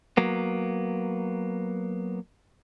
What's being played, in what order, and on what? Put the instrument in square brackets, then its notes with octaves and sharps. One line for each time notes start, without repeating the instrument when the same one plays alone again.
[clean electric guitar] F#3 A#3 B3